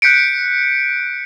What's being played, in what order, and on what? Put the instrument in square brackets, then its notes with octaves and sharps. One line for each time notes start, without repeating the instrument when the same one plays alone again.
[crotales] F#6 G6 B6 C#7 D7